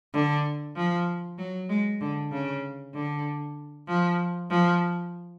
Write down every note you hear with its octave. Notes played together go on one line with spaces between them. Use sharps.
D3
F3
F#3
G#3
D3
C#3
D3
F3
F3